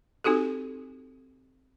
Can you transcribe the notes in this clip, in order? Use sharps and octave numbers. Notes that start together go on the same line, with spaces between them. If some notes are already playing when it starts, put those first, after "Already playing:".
C4 D#4 F#4 G4 A4